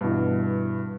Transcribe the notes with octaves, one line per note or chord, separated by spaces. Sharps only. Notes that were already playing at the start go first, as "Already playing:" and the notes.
G2 B2 E3